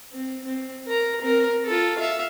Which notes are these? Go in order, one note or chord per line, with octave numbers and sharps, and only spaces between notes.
C4
C4
A#4 A#5
C4 A#4
F4 A4
E5 F5